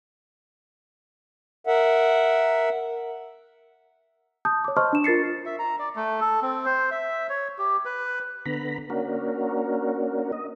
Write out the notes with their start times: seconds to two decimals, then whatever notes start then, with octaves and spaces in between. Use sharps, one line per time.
1.67 A#4 E5 F#5
4.45 A5 D#6 G6
4.64 C#5 D6
4.77 C5 D#5 A5 C6 C#6 F6
4.93 D4 E7
5.04 F4 A#4 A6 C7 C#7
5.46 E5
5.59 A#5
5.79 D5
5.96 A3
6.20 A4
6.42 C4
6.65 C5
6.91 E5
7.29 C#5
7.58 G4
7.85 B4
8.46 D3 B3 A#5 B5
8.90 A#3 C#4 D4 F#4 A#4
10.32 D#5